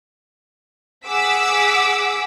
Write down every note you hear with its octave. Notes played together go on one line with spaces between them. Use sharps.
G#4 F#5 D6 E6 B6